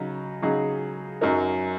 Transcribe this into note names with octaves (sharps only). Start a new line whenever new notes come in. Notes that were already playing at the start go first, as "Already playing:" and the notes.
Already playing: C#3 F#3 D#4
C#3 F#3 D#4 G#4
F#2 F#3 D#4 A#4